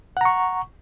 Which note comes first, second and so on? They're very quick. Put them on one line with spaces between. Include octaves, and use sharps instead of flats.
F#5 A#5 C#6